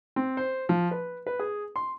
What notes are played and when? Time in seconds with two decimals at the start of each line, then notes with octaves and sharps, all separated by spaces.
0.16 C4
0.37 C5
0.69 F3
0.91 B4
1.27 B4
1.39 G#4
1.76 C6